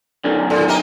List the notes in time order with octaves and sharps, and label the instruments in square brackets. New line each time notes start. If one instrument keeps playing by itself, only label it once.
[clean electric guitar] F#2 D#3 [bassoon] D3
[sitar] A2 [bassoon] D3
[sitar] A#3 A#4 D#5 [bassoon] G4